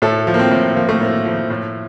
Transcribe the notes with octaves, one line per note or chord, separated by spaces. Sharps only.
A2 A4
F3
A#3
C4
A2
F3 A#3
A3
A2 A#3
F3
A2